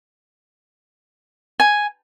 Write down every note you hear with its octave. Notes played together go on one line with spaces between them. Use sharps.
G#5